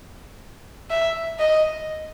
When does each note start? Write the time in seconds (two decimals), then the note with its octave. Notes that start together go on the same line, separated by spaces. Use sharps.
0.90 E5
1.39 D#5